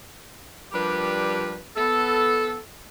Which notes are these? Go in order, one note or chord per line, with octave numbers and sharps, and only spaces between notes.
F3 G3 D4 G4 A#4 B4
B3 A4